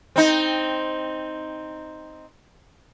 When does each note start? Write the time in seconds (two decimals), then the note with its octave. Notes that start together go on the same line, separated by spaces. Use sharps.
0.16 C4 D#4